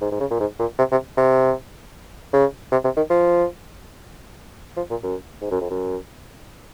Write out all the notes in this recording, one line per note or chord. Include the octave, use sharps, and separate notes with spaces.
G#2
G#2
C#3
A#2
G#2
A#2
C3
C3
C3
C#3
C3
C3
D#3
F3
F3
A#2
F#2
G#2
F#2
F2
F#2